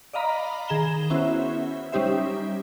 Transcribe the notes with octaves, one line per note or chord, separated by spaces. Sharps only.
D5 D#5 F5 A#5 B5
D#3 G#4 A#5 E7 G7
B3 C#4 E4 F#4 C5 E5
G3 C#4 D#4 G4 C5 E5